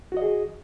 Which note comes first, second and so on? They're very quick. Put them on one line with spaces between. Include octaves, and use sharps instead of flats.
F#4 D#5 G#4